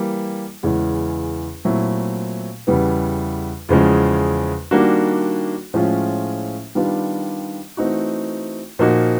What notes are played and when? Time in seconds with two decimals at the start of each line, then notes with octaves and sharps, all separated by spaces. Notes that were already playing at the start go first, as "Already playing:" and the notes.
Already playing: E3 G3 A#3
0.63 E2 C#3 E3 G#3 C#4
1.65 A#2 F#3 A3 C4 E4
2.67 E2 C#3 E3 G3 B3
3.69 E2 C#3 F3 G#3
4.71 D#3 G3 A#3 D4 F#4
5.74 A2 F3 G#3 C#4 F4
6.75 D#3 G3 B3 D4 F4
7.77 E3 A3 C4 D#4 F#4
8.79 A#2 F3 A#3 D#4 F#4